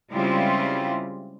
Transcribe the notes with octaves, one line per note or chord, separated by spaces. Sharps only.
C#3 G3 G#3 C4 E4 F4